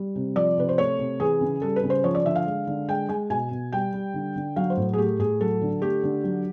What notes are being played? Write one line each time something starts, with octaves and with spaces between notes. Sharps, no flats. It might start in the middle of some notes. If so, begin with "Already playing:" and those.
Already playing: G3
C3
F3 D5
C3 B4
C5
A3 C#5
C3
E3 G#4
C#3
G3 A4
B4
C#3
C5
F3 C#5
D5
D3 E5
F5
G#3
D3
G#3 G5
G#3 G#5
B2 G#5
B2
G3 G5
G3
D3
D3
F#3 F5
C5
A2
G#4
A3 G4
A2 G#4
F#3 A4
D3
A3 G4
D3
F#3